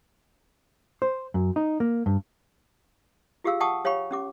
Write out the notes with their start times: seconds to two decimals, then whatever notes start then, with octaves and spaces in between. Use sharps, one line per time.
1.02 C5
1.34 F#2
1.56 D#4
1.80 A#3
2.06 G2
3.44 F4 G4 G#4 F5 E6
3.60 F#5 G5 A5 C#6 D#6
3.84 G4 C#5 F5 G5 B5 C#6
4.11 C#4 G4 D6